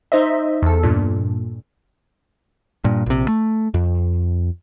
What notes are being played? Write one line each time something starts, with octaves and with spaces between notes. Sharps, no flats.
D#4 C5 D#5 E5
E2 A4
G2 A#2
G2 A#2
A#1 C3
A3
F2